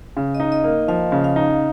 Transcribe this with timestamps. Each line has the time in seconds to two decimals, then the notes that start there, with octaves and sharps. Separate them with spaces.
0.17 C#3
0.35 D#5
0.40 D#4
0.52 D#5
0.64 A#3
0.88 F3 F5
1.12 C#3
1.24 F5
1.36 D#4